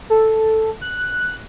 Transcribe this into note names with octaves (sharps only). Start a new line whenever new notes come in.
A4
F#6